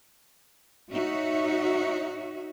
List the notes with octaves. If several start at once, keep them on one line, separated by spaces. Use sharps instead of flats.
D#4 F#4 C#5 E5